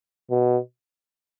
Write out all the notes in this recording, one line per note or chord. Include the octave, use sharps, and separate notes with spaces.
B2